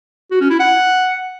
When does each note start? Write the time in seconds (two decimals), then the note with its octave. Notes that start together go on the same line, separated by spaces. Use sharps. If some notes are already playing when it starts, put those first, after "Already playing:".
0.31 F#4
0.41 C#4
0.50 E4
0.59 F#5